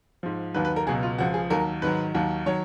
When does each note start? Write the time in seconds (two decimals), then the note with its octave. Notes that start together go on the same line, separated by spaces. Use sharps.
0.23 G#2 F3
0.54 D#2 D#3 F#3 B4
0.65 B4
0.76 A#4
0.87 C#2 B2 F#3 G#4
1.03 F4
1.18 C#2 C#3 F3 F#4
1.34 G#4
1.50 D#2 D#3 F#3 A#4
1.82 G#2 D#3 F#3 B4
2.14 D#2 D#3 F#3
2.46 D#3 F#3 C#5